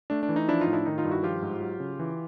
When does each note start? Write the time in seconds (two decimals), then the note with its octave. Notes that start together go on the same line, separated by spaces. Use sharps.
0.10 A3 D4
0.23 D4
0.29 E3
0.36 D#4
0.48 F3 D4 E4
0.61 D#4 F4
0.67 A2
0.73 D4 E4
0.85 D#3 D#4
0.98 D#4 F4
1.04 G2
1.10 E4 F#4
1.23 F3 F4 G4
1.42 G#2
1.61 F#3
1.80 C#3
1.99 E3